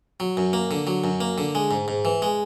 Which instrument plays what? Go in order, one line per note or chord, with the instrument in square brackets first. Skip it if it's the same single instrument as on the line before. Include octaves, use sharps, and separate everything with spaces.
[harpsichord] F#3
F#2
A#3
D3
F#3
F#2
A#3
D3
G#3
G#2
G#2
E3
G#3